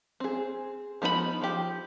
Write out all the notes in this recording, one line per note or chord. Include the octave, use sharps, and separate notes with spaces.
C4 G#4
F3 B3 D#4 F4 B5
F3 G4